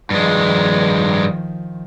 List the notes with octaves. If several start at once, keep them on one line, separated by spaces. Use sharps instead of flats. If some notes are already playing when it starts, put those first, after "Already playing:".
G2 D#3 F3 G#3